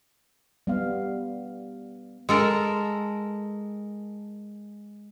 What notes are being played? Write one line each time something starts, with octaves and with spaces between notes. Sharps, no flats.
G3 B3 F5
G#3 A4 A#4